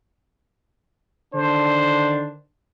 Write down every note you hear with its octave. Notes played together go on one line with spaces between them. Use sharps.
D3 D#3 D4 C5